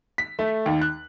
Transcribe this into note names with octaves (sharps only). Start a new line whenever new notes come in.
B6
A3
D#2
F#6